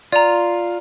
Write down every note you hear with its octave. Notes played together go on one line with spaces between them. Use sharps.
F4 D5 A#5